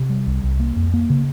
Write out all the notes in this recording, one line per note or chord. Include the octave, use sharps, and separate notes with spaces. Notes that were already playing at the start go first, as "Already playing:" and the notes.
Already playing: C3
G3
C2
C2
A#3
F2
A#3
C#3